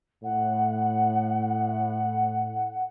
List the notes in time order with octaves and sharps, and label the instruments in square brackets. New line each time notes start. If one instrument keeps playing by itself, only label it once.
[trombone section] A2 [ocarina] F#5